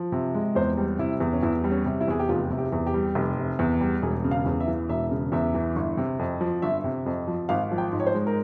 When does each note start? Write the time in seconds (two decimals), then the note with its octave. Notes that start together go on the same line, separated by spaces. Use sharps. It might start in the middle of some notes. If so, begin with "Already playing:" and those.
Already playing: F3
0.12 C3
0.34 G#3
0.55 E2 C5
0.78 G3
0.99 C3 E4
1.20 E2
1.33 C#4
1.43 E2 E4
1.64 G3
1.71 C#4
1.86 C3
2.01 E4
2.08 E2 G#4
2.19 G4
2.29 F1 F4
2.51 C3
2.58 G4
2.72 E2
2.87 G4
2.94 G3
3.15 F1
3.38 C3
3.59 E2
3.81 G3
4.02 E1 G#4
4.24 C#3
4.31 F5
4.46 E2
4.60 E5
4.67 E3
4.89 E1 E5
5.11 C#3
5.32 E2 E5
5.55 E3
5.76 G1
5.97 C3
6.19 F2
6.41 F3
6.62 G1 E5
6.84 C3
7.06 F2
7.28 F3
7.49 G#1 F5
7.71 F3
7.78 G5
7.92 G#2
8.00 C#5
8.07 C5
8.14 G#3
8.27 A#4